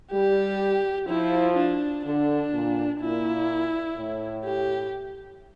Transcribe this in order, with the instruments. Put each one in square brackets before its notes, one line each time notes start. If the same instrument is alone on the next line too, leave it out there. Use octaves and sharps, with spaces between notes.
[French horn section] G3 [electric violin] G4
[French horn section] F3 [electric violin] E4
[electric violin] D4
[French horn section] D3 [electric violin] D4
[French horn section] A#2
[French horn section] A#2 [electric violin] E4
[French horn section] A2
[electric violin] G4